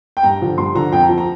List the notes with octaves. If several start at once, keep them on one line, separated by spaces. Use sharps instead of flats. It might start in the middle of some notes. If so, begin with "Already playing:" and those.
G5
G2 A#5
D3 F3
G2 C6
D3 F3 A#5
F2 G5
A#5
F3
A#5